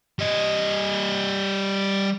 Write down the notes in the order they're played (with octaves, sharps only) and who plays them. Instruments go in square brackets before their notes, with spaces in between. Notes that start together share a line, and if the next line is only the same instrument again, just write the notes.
[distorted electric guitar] G3 D#5